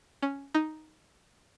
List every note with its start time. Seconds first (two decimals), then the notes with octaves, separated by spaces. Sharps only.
0.23 C#4
0.55 D#4